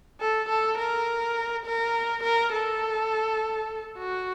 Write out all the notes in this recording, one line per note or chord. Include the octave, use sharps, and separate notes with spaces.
A4
A4
A#4
A#4
A#4
A4
F#4